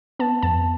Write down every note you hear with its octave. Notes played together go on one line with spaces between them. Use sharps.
B3 A5
F2 A5